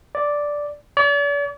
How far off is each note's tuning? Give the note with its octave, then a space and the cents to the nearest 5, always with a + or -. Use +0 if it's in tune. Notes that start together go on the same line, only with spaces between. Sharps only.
D5 -5
D5 -45